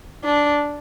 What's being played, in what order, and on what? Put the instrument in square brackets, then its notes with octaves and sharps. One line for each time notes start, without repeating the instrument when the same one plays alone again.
[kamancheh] D4